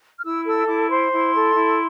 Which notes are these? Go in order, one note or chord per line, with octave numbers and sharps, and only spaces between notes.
F6
E4 E6
A4 E6
E4 D6
C5 C6
E4
A4
E4